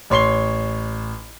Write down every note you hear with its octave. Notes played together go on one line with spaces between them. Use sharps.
A1 C#5 C6 C7 G7